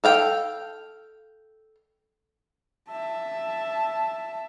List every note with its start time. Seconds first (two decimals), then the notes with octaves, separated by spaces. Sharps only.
0.04 A4 F5 G5
2.90 E5 A5